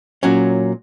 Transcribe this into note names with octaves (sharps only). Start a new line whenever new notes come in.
A#2 F#3 C#4